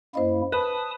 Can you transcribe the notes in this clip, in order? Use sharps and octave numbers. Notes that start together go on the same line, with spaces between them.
F#2 A#3 E4 C5 D#5
B4 A5 D#6